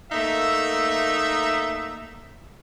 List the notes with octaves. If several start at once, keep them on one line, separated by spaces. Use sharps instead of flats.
A3 A#3 D#4 E5